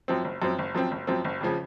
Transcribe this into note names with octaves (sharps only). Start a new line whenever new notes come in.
F#2 F3 C4
F#1
F#2 F3 C4
F#1
F#2 F3 C4
F#1
F#2 F3 C4
F#1
F2 C#3 F3